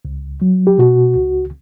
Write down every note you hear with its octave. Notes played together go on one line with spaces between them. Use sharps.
C#2
F#3
G4
B2 F#4
C#2